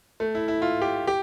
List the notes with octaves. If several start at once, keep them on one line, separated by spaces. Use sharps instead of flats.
A3
E4
E4
F4
G4
G4